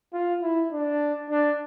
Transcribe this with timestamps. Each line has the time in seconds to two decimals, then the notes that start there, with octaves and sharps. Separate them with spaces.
0.13 F4
0.43 E4
0.72 D4
1.30 D4